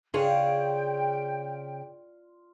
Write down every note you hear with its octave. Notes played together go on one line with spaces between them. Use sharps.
C#3 D4 F4 G#4 C#5 G5